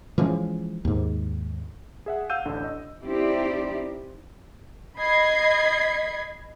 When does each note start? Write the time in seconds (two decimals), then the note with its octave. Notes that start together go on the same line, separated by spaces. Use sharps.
0.18 E3 F3 G#3 C#4
0.85 D#2 G#2
2.06 G#4 E5 F#5
2.30 F5 F#5 E6 G6 D#7
2.45 A1 D2 D3
2.64 D#5
3.04 C4 D#4 E4 G4 C5 D5
4.97 D#5 B5 G#6 C7